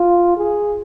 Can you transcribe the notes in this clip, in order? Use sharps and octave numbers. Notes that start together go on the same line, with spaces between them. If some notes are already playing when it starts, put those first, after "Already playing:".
Already playing: F4
G#4